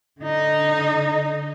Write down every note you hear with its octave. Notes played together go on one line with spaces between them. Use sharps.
D3 D#4